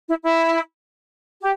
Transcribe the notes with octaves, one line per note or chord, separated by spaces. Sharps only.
E4
E4
G4